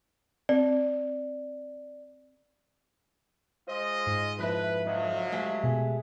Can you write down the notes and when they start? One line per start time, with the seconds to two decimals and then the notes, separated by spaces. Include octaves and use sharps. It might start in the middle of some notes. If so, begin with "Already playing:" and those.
0.49 C4 D5
3.67 G#3 F4 C5 D#5
4.07 G#2
4.39 F2 F3 E4 B4 E5
4.87 D3 F3 F#3 D#5
5.32 G#3 A3 G4
5.64 B2 G#4